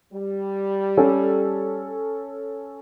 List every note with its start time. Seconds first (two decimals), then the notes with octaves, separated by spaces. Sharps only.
0.13 G3
0.97 C#4 A4